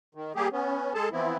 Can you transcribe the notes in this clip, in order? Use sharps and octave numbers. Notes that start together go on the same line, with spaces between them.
D#3
G3 A#3 G4 G#4
B3 C#4
G#3 G#4 A4 A5
E3 F3 B3 C4 E4